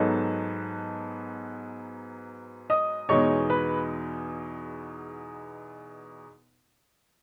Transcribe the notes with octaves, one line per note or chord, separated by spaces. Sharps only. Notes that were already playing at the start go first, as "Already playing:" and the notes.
Already playing: G#2 F#3 B3 D#4 A4 A5
D#5 D#6
E2 B2 G#3 D#4 C#5 C#6
B4 B5